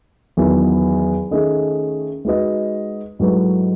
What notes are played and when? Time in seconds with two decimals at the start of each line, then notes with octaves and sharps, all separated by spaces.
0.37 E2 D#3 F#3 B3 E4
1.31 D#3 A3 C#4 G#4 D#5
2.25 G#3 D#4 F#4 B4 D#5
3.19 G#2 F#3 A3 E4 B4